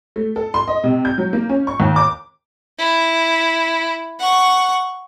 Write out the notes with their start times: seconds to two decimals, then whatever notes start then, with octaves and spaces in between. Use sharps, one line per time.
0.16 A3
0.36 A4
0.54 C6
0.68 D#5
0.84 C3
1.05 G6
1.18 F#3
1.33 A#3
1.49 C#4
1.67 C#6
1.80 D#2
1.96 D6
2.79 E4
4.19 F#5 C#6